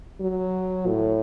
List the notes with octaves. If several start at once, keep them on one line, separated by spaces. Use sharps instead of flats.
F#3
A2